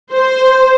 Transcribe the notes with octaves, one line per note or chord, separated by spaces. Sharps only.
C5